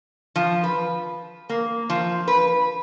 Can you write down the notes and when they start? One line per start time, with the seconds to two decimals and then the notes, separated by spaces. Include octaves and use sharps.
0.36 F3
0.63 B4
1.49 A#3
1.90 F3
2.28 B4